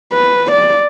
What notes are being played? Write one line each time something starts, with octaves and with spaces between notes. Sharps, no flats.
B4
D5